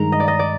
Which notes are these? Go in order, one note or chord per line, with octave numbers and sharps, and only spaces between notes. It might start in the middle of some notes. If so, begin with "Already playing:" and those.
Already playing: G2 D#3 G#3 A#5
D#5
D5
D#5
D5